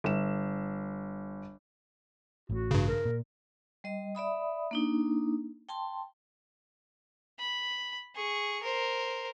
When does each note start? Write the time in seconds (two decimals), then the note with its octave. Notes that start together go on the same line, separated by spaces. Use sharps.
0.04 G1 E7
2.50 A1 A2 F#4
2.71 G2 C#3
2.88 A#4
3.05 A#2
3.84 G3 D#5
4.15 D5 E5 B5 D#6
4.71 A#3 D4 D#4
5.69 G5 A5 C6
7.39 B5
8.15 G#4 C#6
8.62 A#4 C5